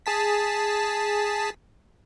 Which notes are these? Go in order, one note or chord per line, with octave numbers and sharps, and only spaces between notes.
G#4 A5 B6